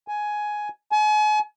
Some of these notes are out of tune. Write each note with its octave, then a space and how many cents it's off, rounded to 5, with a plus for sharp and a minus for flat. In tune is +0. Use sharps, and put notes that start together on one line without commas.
G#5 +10
G#5 +40